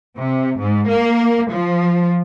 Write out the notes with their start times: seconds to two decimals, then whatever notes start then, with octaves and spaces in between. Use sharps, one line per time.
0.18 C3
0.60 G#2
0.90 A#3
1.52 F3